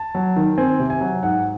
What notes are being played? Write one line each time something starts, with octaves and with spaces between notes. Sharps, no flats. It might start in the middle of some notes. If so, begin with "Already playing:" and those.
Already playing: A5
F#3
D#3
C4 G#5
C3
G#5
F#3
G#2 F#5